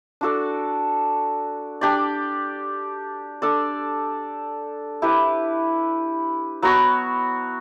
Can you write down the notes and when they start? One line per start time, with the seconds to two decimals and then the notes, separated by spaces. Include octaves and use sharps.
0.21 D4 F#4 A4 D5
1.81 D4 G4 D5
3.42 D4 A4 D5
5.02 E4 G4 B4
6.62 F#3 B3 F#4 C#5